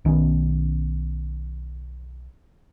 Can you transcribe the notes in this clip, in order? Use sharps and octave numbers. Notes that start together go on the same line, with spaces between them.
B1 D#3 B3 C#4